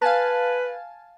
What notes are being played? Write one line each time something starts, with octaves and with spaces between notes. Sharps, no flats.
B4 F5 G#5 A5